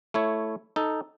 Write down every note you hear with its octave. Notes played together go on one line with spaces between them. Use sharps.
A3 E4 C#5
D#4 A4